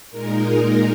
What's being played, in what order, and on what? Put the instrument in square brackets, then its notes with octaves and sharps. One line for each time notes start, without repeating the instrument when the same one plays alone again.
[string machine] A#2 G#3 D#4 A#4